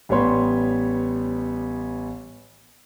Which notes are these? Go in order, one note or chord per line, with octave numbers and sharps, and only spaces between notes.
A1 G3 B3 C#5 C6